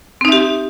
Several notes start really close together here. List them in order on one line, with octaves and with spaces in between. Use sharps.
C4 D#4 E5 G4